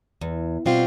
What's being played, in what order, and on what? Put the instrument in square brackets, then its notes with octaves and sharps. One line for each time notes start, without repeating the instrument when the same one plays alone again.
[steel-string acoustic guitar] E2
B2 G3 C4 F4